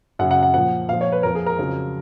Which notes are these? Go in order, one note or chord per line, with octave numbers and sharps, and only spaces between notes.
F#2 C#3 F#3 F#5
F#5
F#5
A#2 F3 F#5
A#2 F3 F5
C#5
B4
F2 F3 A#4
G#4
A#4
F2 C#3 F#3